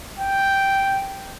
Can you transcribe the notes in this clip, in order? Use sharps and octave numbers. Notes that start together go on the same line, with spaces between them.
G5